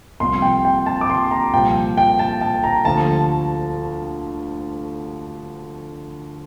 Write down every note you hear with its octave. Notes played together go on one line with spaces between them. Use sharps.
C2 C3 F3 C6
G5
G5
A5
D6
C6
A#5
C2 A#2 F3 G5
G5
A5
A5
A#5
D2 D3 F3 A5